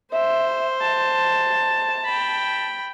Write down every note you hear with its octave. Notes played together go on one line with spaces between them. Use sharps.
C5 E5
A5
G5 B5